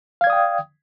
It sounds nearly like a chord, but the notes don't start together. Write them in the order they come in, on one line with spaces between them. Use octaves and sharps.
F5 G#6 D5 D#6 G5